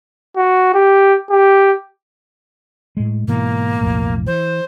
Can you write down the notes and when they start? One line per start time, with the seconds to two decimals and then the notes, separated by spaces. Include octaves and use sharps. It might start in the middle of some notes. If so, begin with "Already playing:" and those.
0.36 F#4
0.74 G4
1.31 G4
2.97 A2 G#3
3.28 G#2 B2 E3 A#3
3.81 B1 F2 A2
4.27 E3 C5